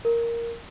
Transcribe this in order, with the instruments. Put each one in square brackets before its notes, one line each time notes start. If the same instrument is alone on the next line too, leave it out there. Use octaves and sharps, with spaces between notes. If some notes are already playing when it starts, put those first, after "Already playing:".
[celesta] A#4